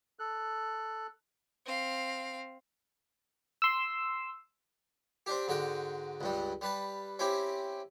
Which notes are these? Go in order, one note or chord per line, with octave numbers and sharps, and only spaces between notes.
A4 F#6
C4 F5
C6 E6
C4 D4 G4
G#2 D3 F#4 G5
C#2 G2 G3
G3 B4 A5
C4 C#4 E4 G4